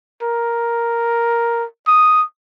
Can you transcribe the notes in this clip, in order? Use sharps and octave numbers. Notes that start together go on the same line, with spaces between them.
A#4
D#6